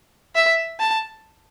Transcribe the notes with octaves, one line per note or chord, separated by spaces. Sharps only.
E5
A5